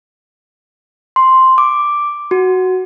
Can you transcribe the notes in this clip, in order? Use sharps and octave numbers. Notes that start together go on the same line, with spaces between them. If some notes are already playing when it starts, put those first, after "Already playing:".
C6
D6
F#4